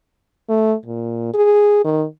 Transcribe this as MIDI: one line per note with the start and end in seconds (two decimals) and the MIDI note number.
0.49 0.74 57
0.86 1.33 46
1.34 1.81 68
1.85 2.05 51